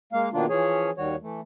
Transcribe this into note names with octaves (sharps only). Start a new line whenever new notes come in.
G#3 A#3 F5
B2 D#3 F3 A#3 D4 F4
E3 F3 C#4 G#4 C#5
D#2 D#3 G3 F#4 C#5
E3 A3